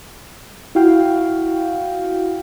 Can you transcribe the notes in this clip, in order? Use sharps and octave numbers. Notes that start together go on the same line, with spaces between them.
E4 F#4 F5 G5